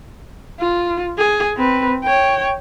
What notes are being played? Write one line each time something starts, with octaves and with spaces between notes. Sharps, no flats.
F4
G#4
C4 B4
C#5 G5